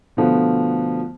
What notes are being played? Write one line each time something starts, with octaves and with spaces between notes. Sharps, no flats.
B2 D3 F3 A3 B3